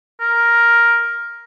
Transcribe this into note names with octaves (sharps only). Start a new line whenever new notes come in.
A#4